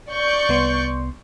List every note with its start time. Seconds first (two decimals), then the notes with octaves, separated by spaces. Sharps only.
0.12 D5 C#6 G6
0.49 C2 B3 C6